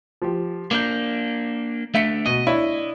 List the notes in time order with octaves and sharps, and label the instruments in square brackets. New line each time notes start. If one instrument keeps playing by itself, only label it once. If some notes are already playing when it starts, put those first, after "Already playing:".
[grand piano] F3 G4
[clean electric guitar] A#3 D4 [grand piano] D6 G6
[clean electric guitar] A3 D4 [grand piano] E5 B6 C#7
[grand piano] B2 D#7 [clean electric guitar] D#5
[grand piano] D4 E4 C#5